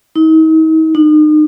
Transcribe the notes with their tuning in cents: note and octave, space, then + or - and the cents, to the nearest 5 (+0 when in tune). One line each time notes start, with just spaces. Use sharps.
D#4 +40
D#4 -35